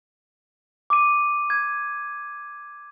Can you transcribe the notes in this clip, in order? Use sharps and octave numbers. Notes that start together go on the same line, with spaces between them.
D6 D#7
G#6